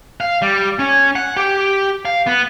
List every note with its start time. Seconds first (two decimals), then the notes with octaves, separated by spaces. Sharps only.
0.21 F5
0.42 G3
0.79 C#4
1.15 F#5
1.36 G4
2.05 F5
2.27 B3